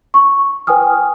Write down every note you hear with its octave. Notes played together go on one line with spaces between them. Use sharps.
C#6
B4 G5 G#5 D#6 F6